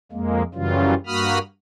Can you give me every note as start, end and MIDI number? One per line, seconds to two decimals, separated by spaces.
0.12 0.42 41
0.12 0.42 56
0.12 0.42 58
0.54 0.94 42
0.54 0.94 49
0.54 0.94 52
0.54 0.94 54
0.54 0.94 55
0.54 0.94 65
1.07 1.39 43
1.07 1.39 58
1.07 1.39 66
1.07 1.39 83
1.07 1.39 87
1.07 1.39 89